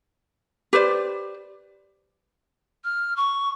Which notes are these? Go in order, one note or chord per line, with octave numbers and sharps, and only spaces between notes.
G4 B4 C5 D5
F6
C#6